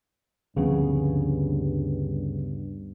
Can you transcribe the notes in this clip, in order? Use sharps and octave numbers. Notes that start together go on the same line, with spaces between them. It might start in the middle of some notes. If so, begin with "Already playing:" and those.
D2 G2 C#3 F3 B3 C4